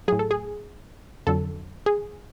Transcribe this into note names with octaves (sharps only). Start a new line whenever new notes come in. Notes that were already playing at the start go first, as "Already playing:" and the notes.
A2 F#3 G#4
A4
G#4
F2 D3 F#3 A4
G#4